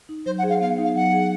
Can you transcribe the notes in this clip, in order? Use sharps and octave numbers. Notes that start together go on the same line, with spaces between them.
D#4
F#3 C5
F#5
G#4
F5
B3 F5
D#4
F5
F#3 F#5
G#4